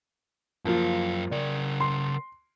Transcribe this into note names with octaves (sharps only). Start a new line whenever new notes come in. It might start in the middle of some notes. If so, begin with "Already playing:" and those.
F#2 F3 A#3 F4 F5
C#3 A#4 D5
C6